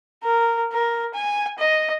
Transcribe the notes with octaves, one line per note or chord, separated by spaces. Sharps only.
A#4
A#4
G#5
D#5